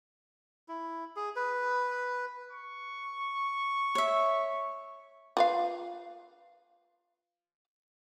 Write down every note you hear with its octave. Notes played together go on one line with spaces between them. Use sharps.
E4
G#4
B4
C#6
C#5 E5
F4 B4 F5